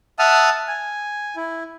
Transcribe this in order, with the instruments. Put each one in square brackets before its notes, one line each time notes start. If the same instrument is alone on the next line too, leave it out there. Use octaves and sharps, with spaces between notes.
[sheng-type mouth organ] E5 F#5 A5 D#6 F6
G#5
E4